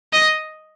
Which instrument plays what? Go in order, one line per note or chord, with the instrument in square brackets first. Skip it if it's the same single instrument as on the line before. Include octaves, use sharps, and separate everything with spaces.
[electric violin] D#5